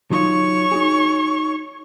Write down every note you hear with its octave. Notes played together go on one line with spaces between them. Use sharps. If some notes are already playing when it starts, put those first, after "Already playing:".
F#3 D#4 F4 C#5 C#6
D#4 F#4 G#4